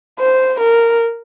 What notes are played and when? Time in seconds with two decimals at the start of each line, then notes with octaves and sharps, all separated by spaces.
0.19 C5
0.60 A#4